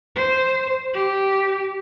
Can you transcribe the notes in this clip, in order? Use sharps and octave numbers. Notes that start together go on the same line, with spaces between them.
C5
G4